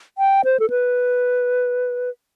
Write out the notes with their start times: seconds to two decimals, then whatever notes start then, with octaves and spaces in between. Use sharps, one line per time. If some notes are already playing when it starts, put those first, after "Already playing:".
0.18 G5
0.45 C5
0.60 A4
0.70 B4